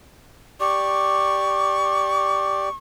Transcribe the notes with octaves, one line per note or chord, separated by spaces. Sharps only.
G4 D5 C#6